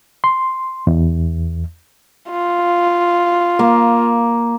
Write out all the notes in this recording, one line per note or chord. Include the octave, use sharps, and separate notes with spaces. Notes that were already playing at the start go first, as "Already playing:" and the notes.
C6
E2
F4
A#3